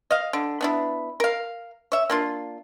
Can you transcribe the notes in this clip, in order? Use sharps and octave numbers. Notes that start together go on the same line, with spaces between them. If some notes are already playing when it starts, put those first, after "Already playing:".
D#5 F5
D3
B3 D4 E4
A#4 F5
C#5 E5
A#3 D4 F4